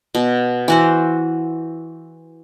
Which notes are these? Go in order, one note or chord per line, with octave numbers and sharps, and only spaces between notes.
B2
E3 F#4 C5